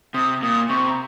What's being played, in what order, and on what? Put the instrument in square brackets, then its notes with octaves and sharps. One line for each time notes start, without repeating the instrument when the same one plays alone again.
[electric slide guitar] C3 [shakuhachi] D#6
[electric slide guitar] A#2 [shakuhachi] D#6
[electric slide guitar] C3 [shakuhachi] C#6
[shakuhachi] A#5